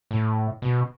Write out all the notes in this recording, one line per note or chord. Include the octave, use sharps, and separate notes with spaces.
A2
B2